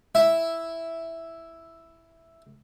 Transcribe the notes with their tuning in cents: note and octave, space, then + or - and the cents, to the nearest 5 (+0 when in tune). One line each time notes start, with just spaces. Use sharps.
E4 +0 E5 +0